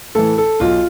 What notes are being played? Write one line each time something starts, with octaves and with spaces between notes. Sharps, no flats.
A2 E3 A4
A4
B1 F4